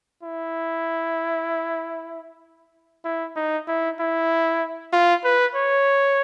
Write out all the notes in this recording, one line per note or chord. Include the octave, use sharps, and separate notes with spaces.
E4
E4
D#4
E4
E4
F4
B4
C#5